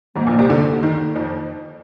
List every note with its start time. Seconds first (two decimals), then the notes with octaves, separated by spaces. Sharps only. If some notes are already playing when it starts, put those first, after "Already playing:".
0.16 G#1 G#2 A#3
0.27 A#1 A#2
0.38 C2 C3
0.49 D2 D3
0.82 D#2 D#3
1.15 F2 F3